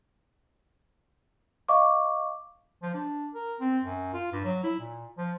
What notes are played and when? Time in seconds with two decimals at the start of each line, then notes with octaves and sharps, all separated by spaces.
1.68 D#5 F5 C#6 D6
2.82 F3
2.94 D4
3.34 A#4
3.60 C4
3.84 F#2
4.14 F4
4.32 G2
4.44 F#3
4.64 E4
4.80 A#2
5.18 F3